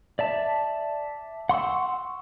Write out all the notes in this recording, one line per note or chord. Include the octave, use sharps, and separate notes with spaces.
D5 E5 A5
F#5 C6 C#6 E6